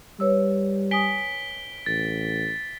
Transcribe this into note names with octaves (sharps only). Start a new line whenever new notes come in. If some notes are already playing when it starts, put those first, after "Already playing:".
G3 B4 C#5 E6
G#5 D#6 B6 D7 G7
A1 A6